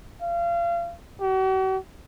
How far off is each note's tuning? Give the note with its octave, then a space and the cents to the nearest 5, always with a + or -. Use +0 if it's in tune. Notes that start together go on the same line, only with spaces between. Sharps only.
F5 -30
F#4 +45